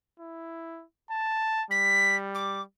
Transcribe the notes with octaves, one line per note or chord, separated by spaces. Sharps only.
E4
A5
G3 B6
D6